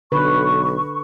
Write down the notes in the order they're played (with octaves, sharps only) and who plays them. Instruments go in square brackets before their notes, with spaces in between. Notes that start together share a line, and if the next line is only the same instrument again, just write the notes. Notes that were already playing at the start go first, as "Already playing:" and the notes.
[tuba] B1 [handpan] D3 B4 [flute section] C#6